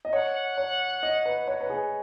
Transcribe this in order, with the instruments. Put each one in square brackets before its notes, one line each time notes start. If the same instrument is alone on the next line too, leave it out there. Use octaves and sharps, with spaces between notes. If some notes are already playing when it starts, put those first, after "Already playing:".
[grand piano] D#5
[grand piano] C#5 [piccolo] F#5
[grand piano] C#5
D#5
B4
C#5
B4
G#4